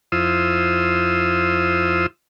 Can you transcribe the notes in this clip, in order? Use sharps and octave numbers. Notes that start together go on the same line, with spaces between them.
F2 E4 F4 C5 D#6 E6